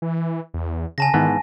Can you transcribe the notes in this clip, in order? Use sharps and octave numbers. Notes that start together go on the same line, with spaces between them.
E3
E2
C#3 G#5 A5 A#6
G#2 D#3 E3 B3